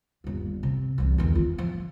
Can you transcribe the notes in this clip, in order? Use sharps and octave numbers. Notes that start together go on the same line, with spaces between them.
G1 D#2
C3
C2 E3
E2 D#3
F4
F3